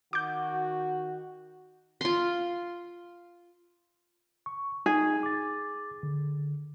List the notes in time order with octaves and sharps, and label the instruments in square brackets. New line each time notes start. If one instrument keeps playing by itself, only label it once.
[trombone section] D#3 F#4 [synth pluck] D6 G6
[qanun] F4 C6
[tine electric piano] C#6
[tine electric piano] D#4 [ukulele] G#4
[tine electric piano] D6 A6
D3